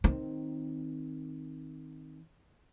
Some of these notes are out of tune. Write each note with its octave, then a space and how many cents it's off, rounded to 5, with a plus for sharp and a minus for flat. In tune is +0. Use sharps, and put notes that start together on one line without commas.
D#3 +0 C4 +0